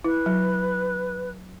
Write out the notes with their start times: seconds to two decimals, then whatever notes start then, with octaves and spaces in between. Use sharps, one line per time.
0.04 E4 B4
0.26 F#3